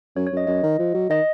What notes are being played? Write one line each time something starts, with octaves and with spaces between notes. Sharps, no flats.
F#2 C#5
C#5
F#2 D#5
F#2 D#5
D#3
F3
F#3
D#3 D#5